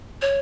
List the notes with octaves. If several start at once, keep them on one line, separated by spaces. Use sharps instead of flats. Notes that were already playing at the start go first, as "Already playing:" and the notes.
C#5